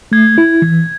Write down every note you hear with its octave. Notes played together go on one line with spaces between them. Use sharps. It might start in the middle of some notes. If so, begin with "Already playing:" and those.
A3 G#6
E4
E3